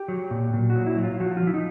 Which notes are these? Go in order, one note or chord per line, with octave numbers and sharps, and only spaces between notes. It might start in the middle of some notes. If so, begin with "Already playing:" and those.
Already playing: G4
F#3
A#2
A#2
F#4
F#3
E4
F#3
F4
F3 F#4
F4
F3 E4
D#4